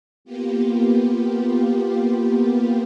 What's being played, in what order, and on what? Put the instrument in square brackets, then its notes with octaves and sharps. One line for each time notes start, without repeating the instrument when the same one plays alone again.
[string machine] A#3 B3 F4 G4